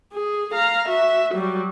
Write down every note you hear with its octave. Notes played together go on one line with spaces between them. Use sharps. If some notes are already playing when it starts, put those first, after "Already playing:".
G#4
F5 A#5
F#4 E5
F#3 G3